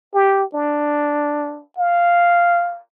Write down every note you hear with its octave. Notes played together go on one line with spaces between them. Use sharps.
G4
D4
F5